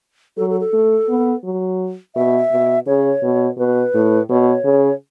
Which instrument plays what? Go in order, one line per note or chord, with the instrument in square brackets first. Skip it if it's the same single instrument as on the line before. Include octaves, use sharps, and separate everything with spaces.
[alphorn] F#3 [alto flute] A4
[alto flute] A4
A4
[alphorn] A3
B3
F#3
[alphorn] B2 [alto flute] E5
[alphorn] B2
[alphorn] C#3 [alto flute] C#5
[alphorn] B2
[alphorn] B2 [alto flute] B4
[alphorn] A2
[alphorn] B2 [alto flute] C#5
[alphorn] C#3